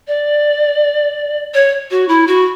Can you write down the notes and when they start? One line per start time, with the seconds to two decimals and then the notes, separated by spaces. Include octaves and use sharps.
0.08 D5
1.54 C#5
1.91 F#4
2.08 E4
2.27 F#4